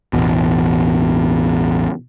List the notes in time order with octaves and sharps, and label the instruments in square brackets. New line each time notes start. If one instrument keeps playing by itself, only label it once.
[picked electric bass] A1 E2 B2